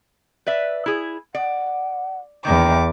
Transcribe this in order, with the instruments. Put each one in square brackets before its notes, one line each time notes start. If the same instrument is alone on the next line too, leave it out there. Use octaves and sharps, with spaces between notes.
[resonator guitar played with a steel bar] B4 D5 E5
E4 G#4
[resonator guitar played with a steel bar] D5 [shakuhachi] F#5
[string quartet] E2 D6 [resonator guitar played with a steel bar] D#3 A#3 D4 [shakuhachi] G5